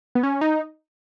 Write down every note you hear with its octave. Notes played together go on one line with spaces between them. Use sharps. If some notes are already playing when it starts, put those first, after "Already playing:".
B3
C#4
D#4